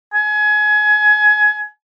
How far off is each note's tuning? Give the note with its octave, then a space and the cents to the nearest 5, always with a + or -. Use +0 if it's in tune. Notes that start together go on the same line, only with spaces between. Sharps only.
G#5 +25